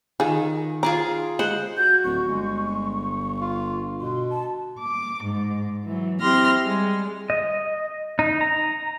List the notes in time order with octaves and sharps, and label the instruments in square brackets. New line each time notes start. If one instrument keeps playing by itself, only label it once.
[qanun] D#3 [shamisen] F4 G#4
[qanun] F4 G#4 D6 [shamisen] A#5
[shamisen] G#3 [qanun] C5 F#5
[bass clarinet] F#4 [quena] G6
[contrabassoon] D1 [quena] C#6
[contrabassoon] G1 [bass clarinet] G#3
[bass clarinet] F4
[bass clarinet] B2 [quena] C6
[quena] A5
[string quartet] D6
G#2
E3 F#3
C4 E4 G4 C6 F6 A#6
G3 G#3
[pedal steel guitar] D#5
D#4
A#5